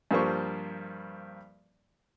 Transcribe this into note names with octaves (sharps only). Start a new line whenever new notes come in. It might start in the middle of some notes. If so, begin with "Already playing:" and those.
G2 F3 G3 A#3 C5 C#6